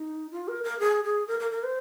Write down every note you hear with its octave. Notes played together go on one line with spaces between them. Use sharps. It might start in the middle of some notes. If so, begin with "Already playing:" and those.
Already playing: D#4
F4
A#4
A#4
G#4
G#4
A#4
A#4
A#4
C5